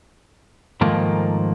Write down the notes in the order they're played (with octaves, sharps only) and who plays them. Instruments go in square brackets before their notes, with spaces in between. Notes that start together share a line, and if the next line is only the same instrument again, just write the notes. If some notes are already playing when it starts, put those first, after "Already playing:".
[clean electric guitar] G#2 D#3 F3 A3 A#3